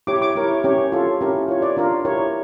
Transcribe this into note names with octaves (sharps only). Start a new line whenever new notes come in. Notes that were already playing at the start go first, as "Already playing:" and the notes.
E4 G4 C#5 D6
D6
E4 A#4 C#5
C#4 G4 C#5
F4 A4 C#5
C#4 E4 G4 A#4
F4 C#5
D5
D4 F4 A#4
E4 G4 A#4 C#5